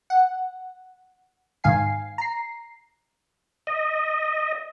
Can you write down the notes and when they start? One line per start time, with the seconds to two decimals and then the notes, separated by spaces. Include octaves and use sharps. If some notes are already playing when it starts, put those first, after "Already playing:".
0.10 F#5
1.64 G#2 D#3 F5 G#5 C7
2.18 A#5 C7
3.67 D#5